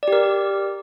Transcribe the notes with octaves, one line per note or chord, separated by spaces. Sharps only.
G4 A#4 D5